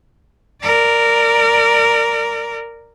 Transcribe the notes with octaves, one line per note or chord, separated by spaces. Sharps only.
A#4 D5